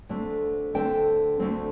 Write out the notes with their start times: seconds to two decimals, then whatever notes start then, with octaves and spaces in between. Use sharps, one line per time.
0.09 D2 D3 A3 C4
0.74 D2 D3 A3 C4 G5
1.40 D2 D3 A3 C4